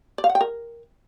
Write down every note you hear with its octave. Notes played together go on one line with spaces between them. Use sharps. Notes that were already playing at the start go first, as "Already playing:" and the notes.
D5
F5
F#5
G5
A#4